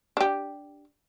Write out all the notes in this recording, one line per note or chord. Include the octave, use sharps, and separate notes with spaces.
D4 G4